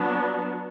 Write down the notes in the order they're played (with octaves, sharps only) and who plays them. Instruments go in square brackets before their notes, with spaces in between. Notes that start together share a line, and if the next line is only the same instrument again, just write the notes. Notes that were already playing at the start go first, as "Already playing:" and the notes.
Already playing: [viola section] F#3 B3 D4